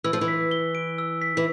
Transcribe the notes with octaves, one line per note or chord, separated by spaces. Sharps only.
E3 E6
F3
E3
B6
G7
D7
E6
B6
E3